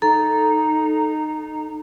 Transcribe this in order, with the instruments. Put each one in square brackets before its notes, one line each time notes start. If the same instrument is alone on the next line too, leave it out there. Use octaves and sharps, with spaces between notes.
[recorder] D#4 [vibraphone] A4 [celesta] A#5